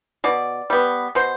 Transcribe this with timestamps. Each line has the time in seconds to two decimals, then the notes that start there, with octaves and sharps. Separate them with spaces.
0.24 B2 D5
0.70 G3 B3
1.15 B2 C5